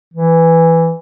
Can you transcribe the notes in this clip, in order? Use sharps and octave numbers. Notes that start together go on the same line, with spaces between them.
E3